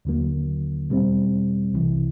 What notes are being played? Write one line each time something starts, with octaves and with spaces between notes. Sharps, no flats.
D#2 D3 F#3 A#3
E2 B2 G3 C4
C2 C3 E3